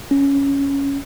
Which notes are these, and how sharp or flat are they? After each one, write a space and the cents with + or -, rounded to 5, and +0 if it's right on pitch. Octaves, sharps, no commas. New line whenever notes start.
C#4 +5